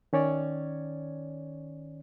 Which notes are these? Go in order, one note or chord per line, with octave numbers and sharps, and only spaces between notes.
D#3 C#4 C#5 D5